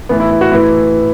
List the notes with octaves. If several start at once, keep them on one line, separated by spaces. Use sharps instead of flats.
A2 E3 B3
E4
E4
F#4
A2 E3 E4